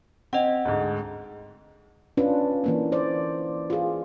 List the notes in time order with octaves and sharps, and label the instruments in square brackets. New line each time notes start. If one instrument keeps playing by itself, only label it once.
[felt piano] C4 [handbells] D#5 F#5
[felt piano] D2 G#2
[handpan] C#4 D4 F4 B4
E3 A#3 D4
A#3 C5 D5
F4 G#4